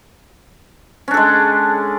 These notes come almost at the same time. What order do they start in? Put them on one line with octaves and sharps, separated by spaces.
C#4 D4 A4 G#3